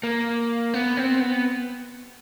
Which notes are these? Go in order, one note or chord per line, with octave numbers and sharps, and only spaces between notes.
A#3
B3
C4
B3